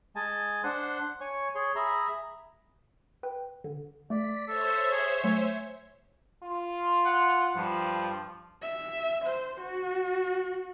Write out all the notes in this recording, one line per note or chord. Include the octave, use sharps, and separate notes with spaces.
G#3 D#5 G#5 A5
D4 C5 F#5 C6 F#6
C#5 G#5 C#6
G#4 C#5 C6
G#4 E5 A#5 B5
B4 G5
D3
A3 D5 B6
A4 C5 C#5 E5
G#4
F#3 A3 G#5
F4
F#5
G2 F3
E5
C5
F#4